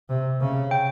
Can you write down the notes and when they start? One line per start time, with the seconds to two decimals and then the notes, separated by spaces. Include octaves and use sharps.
0.09 C3
0.40 C#3
0.71 G5